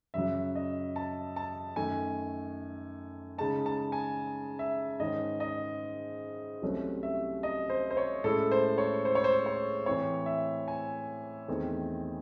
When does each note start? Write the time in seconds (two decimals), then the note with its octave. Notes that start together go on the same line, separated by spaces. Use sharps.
0.14 F#2 C#3 F#3 E5
0.55 D#5
0.96 A5
1.36 A5
1.76 F#2 D#3 A3 G#5
3.38 C#3 G#3 D#4 A5
3.66 A5
3.92 G#5
4.59 E5
5.00 G#2 D#3 G#3 C#4 D#5
5.40 D#5
6.62 C2 C3 F#3 A3 C#4
7.03 E5
7.43 D#5
7.70 C5
7.91 C5
7.97 C#5
8.24 A2 G#3 C#4 E4 A4
8.51 C5
8.78 C#5
9.05 C5
9.15 C#5
9.24 C5
9.46 C#5
9.86 A2 E3 C4 C#5
10.26 E5
10.68 G#5
11.48 E2 D#3 A3 C4